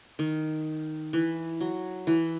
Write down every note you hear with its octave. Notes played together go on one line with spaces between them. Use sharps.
D#3
E3
F#3
E3